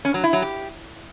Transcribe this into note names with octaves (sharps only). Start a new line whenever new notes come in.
C#4
F#3
E4
F#3
G4